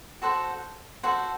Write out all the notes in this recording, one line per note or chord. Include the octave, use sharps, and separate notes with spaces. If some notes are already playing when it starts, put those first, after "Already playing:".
F#4 A4 C5 F#5
F#4 A4 C5 F#5